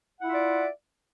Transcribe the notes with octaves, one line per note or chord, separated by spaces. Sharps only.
E4 F4 D5 E5 F#5